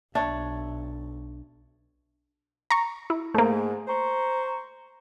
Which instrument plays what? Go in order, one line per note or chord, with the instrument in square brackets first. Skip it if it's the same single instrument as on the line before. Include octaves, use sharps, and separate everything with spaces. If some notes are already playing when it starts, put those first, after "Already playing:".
[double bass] B1 [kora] D4 C#5 [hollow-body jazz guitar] E5
[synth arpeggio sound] A#5 C#6
E4
[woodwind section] G#2 [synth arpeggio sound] A3 A#3
[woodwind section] C5 A#5 C#6